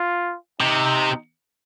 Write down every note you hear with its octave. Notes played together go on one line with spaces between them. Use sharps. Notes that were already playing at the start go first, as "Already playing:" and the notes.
Already playing: F4
C3 D#4